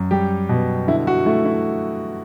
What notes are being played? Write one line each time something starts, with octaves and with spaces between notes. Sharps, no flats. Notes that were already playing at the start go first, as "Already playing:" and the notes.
Already playing: F#2
G3 G4
B2
D3 E4
F#4
A3 E4
E4